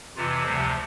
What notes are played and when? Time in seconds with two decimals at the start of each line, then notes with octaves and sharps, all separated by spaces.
0.16 F2 C3 E3 F4
0.44 D2 C3 F3 G3 G4